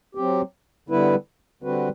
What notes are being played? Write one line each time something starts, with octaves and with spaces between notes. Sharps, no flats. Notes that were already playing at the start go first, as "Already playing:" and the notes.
F#3 C4 G4
D3 G3 B3 E4 B4
D3 G3 C4 F#4 B4